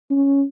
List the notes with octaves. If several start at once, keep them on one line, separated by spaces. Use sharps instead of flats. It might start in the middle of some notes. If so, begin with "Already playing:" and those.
C#4